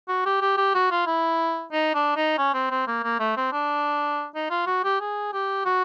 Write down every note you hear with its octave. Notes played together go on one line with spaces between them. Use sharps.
F#4
G4
G4
G4
F#4
F4
E4
D#4
D4
D#4
C#4
C4
C4
A#3
A#3
A3
C4
D4
D#4
F4
F#4
G4
G#4
G4
F#4